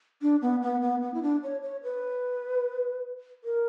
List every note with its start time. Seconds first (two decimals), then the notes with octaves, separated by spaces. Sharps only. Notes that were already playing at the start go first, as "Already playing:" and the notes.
0.22 D4
0.42 B3
0.62 B3
0.82 B3
1.02 B3
1.14 E4
1.22 D4
1.43 C#5
1.63 C#5
1.83 B4
3.44 A#4